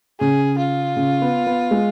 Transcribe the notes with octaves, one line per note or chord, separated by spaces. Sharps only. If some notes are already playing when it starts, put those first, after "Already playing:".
C#3 G#4
F4
C#3
B3
B3
G#3